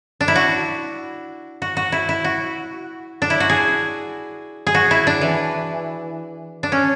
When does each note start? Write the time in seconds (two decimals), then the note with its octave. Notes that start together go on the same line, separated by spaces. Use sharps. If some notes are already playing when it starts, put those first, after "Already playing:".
0.21 D4
0.28 E4
0.36 F#4
1.62 F#4
1.77 F#4
1.92 E4
2.09 E4
2.24 F#4
3.22 D4
3.30 E4
3.40 F#4
3.49 G#4
4.67 G#4
4.75 F#4
4.91 E4
5.07 D4
5.21 E3
6.63 D4
6.72 C#4